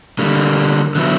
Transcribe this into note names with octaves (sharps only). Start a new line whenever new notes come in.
D3 G3 A#3
D3 F#3 B3 E4